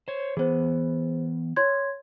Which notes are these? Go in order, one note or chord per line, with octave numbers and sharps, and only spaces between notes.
C5 C#5
E3 B3 G#4 C5
C#5 C6 G#6